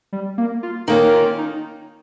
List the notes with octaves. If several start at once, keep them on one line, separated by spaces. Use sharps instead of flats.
G3
A#3
F4
D#3 A#3 C#4 D#4
F4
D#4